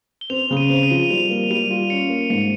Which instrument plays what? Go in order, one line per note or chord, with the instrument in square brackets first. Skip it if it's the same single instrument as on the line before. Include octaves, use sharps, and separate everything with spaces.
[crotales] G7
[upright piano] C4 [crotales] F7
[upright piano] C#3
[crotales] D#7
[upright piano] C4
[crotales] D#7
[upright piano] F3
[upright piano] G3 [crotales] F7
[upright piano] A#3
[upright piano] G3 [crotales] D#7
[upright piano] F4
[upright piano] C#4 [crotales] C#7
[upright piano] A#3
[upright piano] G#2 [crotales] C#7